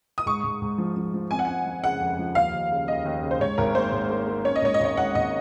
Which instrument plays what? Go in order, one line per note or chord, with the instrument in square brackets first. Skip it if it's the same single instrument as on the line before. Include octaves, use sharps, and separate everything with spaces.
[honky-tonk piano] D#6
[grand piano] G#2 [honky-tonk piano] C#6
[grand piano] G#2
G#2
F3
F3
F3
[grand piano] C4 [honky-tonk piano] G#5
[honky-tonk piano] F#5
[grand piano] C4 [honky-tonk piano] G#5
[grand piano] F3
[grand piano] C#3 [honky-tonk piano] F#5
[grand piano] F2
F3
[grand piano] D#2 [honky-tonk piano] F5
[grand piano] D#2
C#3
[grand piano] D#2 [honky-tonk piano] D#5
[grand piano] D#2
C#3
[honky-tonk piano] C5
[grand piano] G#2 [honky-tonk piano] C#5
[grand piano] G#1 [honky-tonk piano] A#4
[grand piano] A#3 [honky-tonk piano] C5
[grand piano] G#2
A#3
A#3
[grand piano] C#4 [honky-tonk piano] C#5
[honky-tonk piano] D#5
[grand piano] G#2 [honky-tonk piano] C#5
[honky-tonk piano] D#5
[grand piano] G#1 [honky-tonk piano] C#5
[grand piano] G#2 [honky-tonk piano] F#5
[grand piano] G#1 [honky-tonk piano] D#5